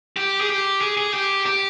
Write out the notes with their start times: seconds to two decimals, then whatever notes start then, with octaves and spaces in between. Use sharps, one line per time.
0.17 G4
0.41 G#4
0.49 G4
0.81 G#4
0.97 G#4
1.14 G4
1.46 G4